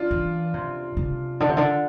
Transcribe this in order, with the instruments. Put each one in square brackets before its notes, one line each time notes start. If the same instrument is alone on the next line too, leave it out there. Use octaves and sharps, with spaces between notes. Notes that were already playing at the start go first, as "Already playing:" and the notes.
Already playing: [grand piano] D4 F4
[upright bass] E3
C3
C3
D3
C3
D3